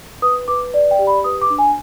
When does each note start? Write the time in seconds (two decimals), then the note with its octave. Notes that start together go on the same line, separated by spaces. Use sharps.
0.22 B4 D#6
0.48 B4 D6
0.74 D5
0.91 G5
0.99 G4
1.07 B5
1.24 B4 D#6
1.42 D6
1.50 D4
1.58 G#5